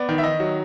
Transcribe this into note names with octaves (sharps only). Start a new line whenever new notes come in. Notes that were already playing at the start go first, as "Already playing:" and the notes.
Already playing: B3 D5
D#3
E5
D#3 D#5
F#3